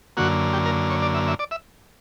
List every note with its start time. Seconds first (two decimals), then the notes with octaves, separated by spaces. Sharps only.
0.17 F#2 D3 A#3 F#4
0.53 G4
0.66 A#4
0.90 C#5
1.02 D5
1.14 E5
1.28 E5
1.39 D5
1.51 E5